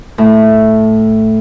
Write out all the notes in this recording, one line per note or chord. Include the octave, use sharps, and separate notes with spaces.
A2